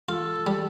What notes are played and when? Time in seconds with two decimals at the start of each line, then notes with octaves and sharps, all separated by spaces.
0.08 F4 A4
0.47 G3